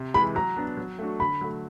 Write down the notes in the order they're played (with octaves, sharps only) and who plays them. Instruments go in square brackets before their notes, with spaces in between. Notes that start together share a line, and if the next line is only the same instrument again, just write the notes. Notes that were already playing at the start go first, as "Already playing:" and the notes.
Already playing: [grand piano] C3
[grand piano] E3 G#3 [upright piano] B5
[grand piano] F#3 [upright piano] A#5
[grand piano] B3 D4
F#3
A3 D4 F#4
[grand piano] D3 [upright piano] B5
[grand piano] F#3 A3